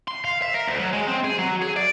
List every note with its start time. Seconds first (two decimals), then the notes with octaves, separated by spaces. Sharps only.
0.08 C6
0.25 F5
0.42 E5
0.54 A#4
0.68 D2
0.80 F#3
0.93 G#3
1.08 C4
1.25 G#4
1.39 F#3
1.62 G#4
1.76 D5